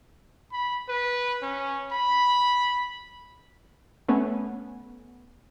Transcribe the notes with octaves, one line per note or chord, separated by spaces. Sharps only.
B5
B4
C#4
B5
A3 B3 C#4